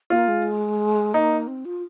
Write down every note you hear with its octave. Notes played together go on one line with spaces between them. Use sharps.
A#3 F4
G#3
A#3 D#4
C4
F4